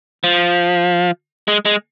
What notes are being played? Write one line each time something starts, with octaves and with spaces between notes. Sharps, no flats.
F3
G#3
G#3